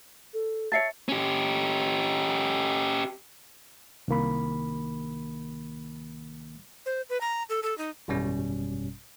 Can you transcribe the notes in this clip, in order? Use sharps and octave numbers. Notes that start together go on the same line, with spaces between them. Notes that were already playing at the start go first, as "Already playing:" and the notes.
A4
C#5 E5 A5 A6 C7 C#7
C#4 G4
C2 D#3 A#3 B5
C5
B4
A#5
A4
A4
D#4
G#1 F#2 B2 G3 C#4